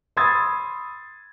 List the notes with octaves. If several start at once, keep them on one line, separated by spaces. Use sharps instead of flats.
B5 C6 D#6 E6 G#6 A6